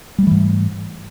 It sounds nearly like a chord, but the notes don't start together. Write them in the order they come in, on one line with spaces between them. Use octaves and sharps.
G3 A3 E3 G#2